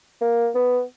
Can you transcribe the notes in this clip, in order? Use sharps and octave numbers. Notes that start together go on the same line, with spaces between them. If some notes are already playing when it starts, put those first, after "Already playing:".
A#3
B3